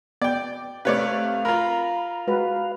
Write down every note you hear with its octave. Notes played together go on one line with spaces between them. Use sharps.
B3 D5 G5
C3 A3 B4 C#5 D5 F5
F4 A#4 A#5 B5
G#3 F#4 B4